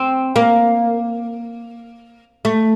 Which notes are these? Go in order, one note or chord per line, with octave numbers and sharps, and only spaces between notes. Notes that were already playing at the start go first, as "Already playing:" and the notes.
Already playing: C4
A#3
A3